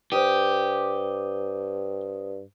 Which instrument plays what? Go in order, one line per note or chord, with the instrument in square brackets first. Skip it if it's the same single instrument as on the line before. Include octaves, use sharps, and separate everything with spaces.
[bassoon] G2 [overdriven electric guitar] G4 [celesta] C5 D#6 D#7